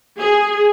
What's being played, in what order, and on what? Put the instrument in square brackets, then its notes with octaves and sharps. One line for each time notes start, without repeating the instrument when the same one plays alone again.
[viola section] G#4